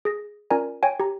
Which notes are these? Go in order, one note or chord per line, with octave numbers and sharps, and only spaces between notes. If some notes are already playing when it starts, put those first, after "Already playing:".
G#4 A#6
C#4 F4 A#4 D5 G#5 A#5
C#5 G5 G#5
G4 A#5